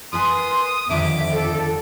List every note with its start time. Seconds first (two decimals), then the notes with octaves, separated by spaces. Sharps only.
0.13 A#4 B4 G#5 C6 D#6
0.90 F2 D3 D#3 G3 E5 D6
1.32 A4